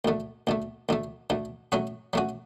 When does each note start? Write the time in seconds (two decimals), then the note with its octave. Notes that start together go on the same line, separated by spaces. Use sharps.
0.05 D2 D3 A3
0.47 D2 D3 A3
0.89 D2 D3 A3
1.30 D2 D3 A3
1.72 F#3 A3 C#4 F#4
2.13 F#3 A3 C#4 F#4